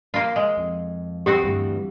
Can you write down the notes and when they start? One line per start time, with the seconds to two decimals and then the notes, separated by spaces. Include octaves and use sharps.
0.14 A#3 F4
0.36 G#3
0.57 F2
1.26 B3 C4 F#4 G4
1.43 D2 G2 E3